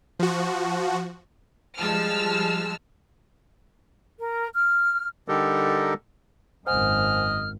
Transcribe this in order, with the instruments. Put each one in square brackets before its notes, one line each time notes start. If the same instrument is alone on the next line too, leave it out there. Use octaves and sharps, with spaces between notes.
[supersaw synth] F3 F#4
[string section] F3 G3 G#3 A5 E6 F6
[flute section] A#4
F6
[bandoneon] D3 G3 D#4 G4 A4 A#4
[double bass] G#1 F#2 [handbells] C5 F#5 G#5 [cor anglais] D#5 [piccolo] F6